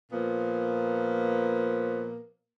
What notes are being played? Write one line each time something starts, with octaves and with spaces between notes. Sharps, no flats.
A#2 F3 A#3 B3